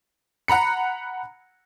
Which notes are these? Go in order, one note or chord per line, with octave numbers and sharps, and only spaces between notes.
F#5 A#5 B5 C#7